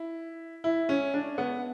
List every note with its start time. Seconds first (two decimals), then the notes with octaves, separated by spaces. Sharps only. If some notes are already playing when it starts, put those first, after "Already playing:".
Already playing: E4
0.64 E4
0.89 C#4
1.14 D4
1.38 B3